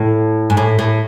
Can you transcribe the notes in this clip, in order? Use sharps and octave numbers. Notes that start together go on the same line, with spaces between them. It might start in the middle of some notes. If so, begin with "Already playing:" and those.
Already playing: A2
G#2
A2
A2